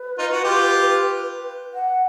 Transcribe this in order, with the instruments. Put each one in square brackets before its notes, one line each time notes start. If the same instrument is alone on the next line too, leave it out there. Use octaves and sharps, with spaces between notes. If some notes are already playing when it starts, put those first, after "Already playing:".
Already playing: [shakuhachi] B4
[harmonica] D#4 F4
F#4
F4 G4
[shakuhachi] F#5